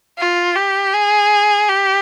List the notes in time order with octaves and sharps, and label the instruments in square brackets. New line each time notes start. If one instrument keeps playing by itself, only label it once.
[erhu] F4
G4
G#4
G4